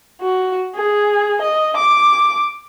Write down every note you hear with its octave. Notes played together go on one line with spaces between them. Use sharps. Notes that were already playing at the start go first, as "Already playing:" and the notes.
F#4
G#4
D#5
D6